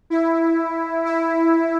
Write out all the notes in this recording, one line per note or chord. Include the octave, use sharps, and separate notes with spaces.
E4
E4